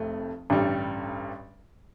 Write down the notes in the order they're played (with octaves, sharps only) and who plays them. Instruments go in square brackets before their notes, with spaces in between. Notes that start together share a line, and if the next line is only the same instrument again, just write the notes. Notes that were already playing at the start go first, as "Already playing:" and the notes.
Already playing: [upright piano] F1 F2 A3
A1 G2 D3 G3